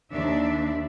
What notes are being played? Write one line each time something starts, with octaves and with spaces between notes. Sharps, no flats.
D#2 D4 E5